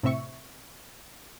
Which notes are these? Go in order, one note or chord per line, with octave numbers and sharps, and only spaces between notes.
A2 C3 C4 E5 C#6